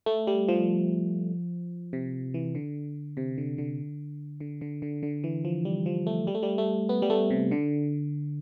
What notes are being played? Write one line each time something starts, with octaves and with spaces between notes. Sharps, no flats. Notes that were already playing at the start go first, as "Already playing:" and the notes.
A3
G3
F3
C3
E3
D3
C3
D3
D3
D3
D3
D3
D3
E3
F3
G3
F3
A3
G3
A3
G3
A3
B3
G3
A3
C3
D3